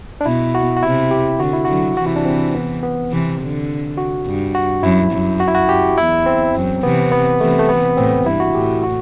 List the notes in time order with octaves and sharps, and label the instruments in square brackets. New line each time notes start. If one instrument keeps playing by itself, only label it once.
[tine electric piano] D4
[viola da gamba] B2 [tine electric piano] E4
[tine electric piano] F#4
F#4
[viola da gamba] C3 [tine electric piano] E4
[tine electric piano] G4
[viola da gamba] D3 [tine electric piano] F#4
[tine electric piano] E4
[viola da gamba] D3 F#3 [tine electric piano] F#4
[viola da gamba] C3 E3 [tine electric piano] F#4
[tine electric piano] E4
D4
C4
B3
B3
[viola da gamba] C3 E3
D3
[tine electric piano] F#4
[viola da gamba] G2
[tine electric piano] F#4
[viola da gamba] F#2 [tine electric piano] E4
[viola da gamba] F#2
[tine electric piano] F#4
E4
F#4
[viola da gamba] F#2 [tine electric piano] G4
[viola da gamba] E2 [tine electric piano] E4
[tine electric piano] C4
[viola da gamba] F#2
[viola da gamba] C3 E3 [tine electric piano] B3
[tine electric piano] B3
[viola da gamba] C3 E3 [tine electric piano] A3
[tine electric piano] A3
B3
[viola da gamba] A2 [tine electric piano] C4
[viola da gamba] G2 [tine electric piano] E4
[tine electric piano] F#4
[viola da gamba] A2 [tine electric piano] G4
[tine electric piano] F#4